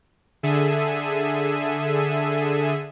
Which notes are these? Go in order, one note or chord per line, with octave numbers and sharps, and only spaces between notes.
D3 G#4 A4 E5 D#7